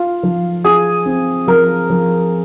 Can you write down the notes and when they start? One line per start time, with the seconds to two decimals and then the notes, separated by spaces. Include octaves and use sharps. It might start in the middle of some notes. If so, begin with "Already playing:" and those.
Already playing: F4 F5
0.23 F3
0.64 F4 G#4
1.06 C4
1.47 F3 A#4
1.90 F3